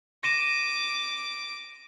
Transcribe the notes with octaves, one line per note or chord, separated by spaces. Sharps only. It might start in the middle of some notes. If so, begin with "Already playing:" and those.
D6 A#6 D#7 E7